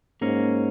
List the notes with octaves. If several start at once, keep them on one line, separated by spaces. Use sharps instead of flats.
G#2 A#3 C#4